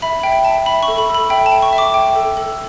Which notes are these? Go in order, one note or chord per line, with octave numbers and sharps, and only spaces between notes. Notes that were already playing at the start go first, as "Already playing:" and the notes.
E5 B5
E5 G5
E5 A5
E5 B5
C#6
A4
B5
A4
B5
E5 G5
A5
G5
C#6
E5
D6
G5
A4
A4